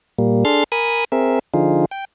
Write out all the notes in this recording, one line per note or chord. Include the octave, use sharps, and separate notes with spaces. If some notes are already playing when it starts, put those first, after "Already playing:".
A#2 G3 A#3
D4 G#4 A4 C6 F6 A6
A#4 G#5 B5 D#6
C4 G#4 A#4 E5
D3 F3 D#4 F4 G#4
G5